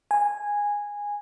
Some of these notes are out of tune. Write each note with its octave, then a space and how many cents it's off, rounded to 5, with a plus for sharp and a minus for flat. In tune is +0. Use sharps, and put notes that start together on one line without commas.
G#5 -10